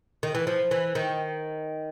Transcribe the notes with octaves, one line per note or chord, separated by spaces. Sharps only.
D#3
E3
F3
E3
D#3